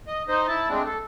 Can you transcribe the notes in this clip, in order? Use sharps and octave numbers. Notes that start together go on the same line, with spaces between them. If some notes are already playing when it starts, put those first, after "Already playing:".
D#5
D#4 C5 D#5
E4 A5
G#3 A3 C4 D4
A4